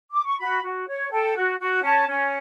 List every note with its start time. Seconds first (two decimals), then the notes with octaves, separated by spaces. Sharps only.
0.12 D6
0.26 C#6
0.39 F#4 B5
0.62 F#4
0.87 C#5
1.11 A4 G5
1.35 F#4
1.59 F#4
1.83 C#4 A5
2.07 C#4